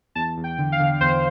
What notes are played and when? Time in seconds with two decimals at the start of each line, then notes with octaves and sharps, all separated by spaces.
0.15 E2 A5
0.37 E2
0.44 G5
0.58 D3
0.72 F5
0.80 D3
1.01 E2 C5